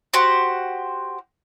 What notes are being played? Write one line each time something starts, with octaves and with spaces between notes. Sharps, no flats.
F#4 G4 C5